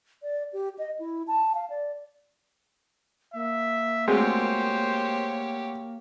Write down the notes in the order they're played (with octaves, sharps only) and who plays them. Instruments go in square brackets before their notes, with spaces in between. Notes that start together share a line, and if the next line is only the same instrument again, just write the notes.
[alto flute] D5
G4
D#5
E4
A5
F5
D5
[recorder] A#3 [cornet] E5
[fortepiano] D2 G#3 C4 [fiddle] G4 C#5 [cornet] C5